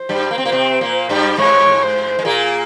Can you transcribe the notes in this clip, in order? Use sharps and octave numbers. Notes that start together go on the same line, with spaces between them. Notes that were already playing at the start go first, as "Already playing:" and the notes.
Already playing: C5
G2 G3
A#3
C4
A#2 A#3
C3 C4
A#2 A#3
G2 G3
G#2 G#3 C#5
C5
G#3
A#2 A#3 G#4